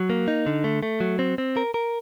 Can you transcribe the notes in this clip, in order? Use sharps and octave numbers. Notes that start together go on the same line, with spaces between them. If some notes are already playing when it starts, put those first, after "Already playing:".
Already playing: F#3
A#3
D#4
D3
A3
A3
F#3
C4
C4
A#4
A#4